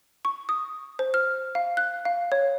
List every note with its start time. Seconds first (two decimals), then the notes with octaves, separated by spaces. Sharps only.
0.25 C#6
0.49 D#6
0.99 C5
1.14 F6
1.55 F5
1.77 F#6
2.05 F5
2.32 C#5